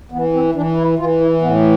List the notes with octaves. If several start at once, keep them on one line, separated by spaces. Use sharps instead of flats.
E3 B3
C4
E3 D4
E4
E3 F4
E4
A2 B3